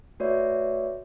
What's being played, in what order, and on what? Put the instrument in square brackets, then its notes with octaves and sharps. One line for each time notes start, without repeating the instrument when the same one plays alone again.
[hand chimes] A3 F#4 B4 C#5 D5 E5